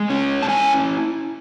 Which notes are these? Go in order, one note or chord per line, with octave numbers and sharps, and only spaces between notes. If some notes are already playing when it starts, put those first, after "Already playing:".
Already playing: G#3
C#4
A5
E4 G#5